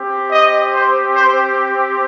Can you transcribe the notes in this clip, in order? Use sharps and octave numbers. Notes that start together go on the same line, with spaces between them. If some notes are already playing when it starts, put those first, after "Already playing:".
Already playing: C4 G4
D#5
C5
C5